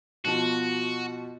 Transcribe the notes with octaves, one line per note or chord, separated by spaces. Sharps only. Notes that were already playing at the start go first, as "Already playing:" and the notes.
B2 F3 F#4